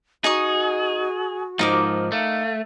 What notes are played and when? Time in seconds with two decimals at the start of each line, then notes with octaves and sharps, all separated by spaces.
0.24 D#4 F#4 G#4 D#5 C#6
1.59 G#2 F3 D#4 A#4 D6
2.12 A3 F5